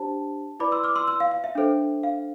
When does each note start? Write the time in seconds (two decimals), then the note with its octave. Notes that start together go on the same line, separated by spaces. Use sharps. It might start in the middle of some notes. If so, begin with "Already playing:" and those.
Already playing: D4 G4 C5 A5
0.60 E4 B4 D5 B5 D6
0.72 C6 E6
0.84 D6 F6
0.96 C6 E6
1.08 C6 E6
1.20 F5
1.31 F5
1.44 E5
1.55 D4 A4 C5
2.03 F5